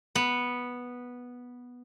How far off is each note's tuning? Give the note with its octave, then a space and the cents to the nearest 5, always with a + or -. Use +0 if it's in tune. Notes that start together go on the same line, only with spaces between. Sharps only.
B3 -5